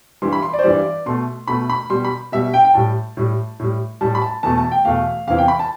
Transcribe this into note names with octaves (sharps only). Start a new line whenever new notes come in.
G2 E3 G3 C6
B5
C6
D5
C5
G2 E3 G3 D5
B2 A3 C6
B2 A3 B5
B5
B2 G3 C6
B5
B2 G3 E5
G5
G5
A2 G3 A5
A2 G3
A2 G3
A2 G3 A5
B5
A5
E2 B2 A3 A5
A5
G5
E2 B2 A3 F5
E2 C3 E3 F5
G5
B5
A5